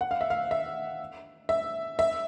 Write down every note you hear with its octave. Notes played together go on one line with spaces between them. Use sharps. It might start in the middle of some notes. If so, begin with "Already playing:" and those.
F#5
F5
E5
F5
E5
E5
E5